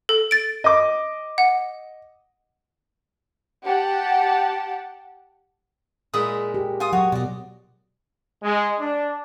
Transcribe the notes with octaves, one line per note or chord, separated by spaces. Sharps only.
A4
A6 D7
D#5 D6
F#5
G4 F#5 G5 A5
A#2 G#3 E4 D#6
G4
F4 G#5 D#6
F#3 F#4 C#5
B2 D5 D#5
G#3
D4